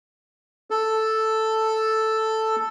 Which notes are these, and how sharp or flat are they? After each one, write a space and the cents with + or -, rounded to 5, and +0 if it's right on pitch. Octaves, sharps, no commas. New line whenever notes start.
A4 +0